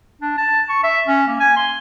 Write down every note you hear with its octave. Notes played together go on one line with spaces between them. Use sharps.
D4
A5
C#6
E5
C#4
A#3
G#5
C6